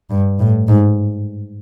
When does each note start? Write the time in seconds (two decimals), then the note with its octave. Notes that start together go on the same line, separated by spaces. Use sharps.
0.10 G2
0.40 A2
0.68 G#2